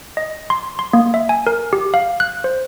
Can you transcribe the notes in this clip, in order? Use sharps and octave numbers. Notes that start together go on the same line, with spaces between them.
D#5
C6
C6
A#3
E5
G#5
A#4
G4
F5
F#6
C5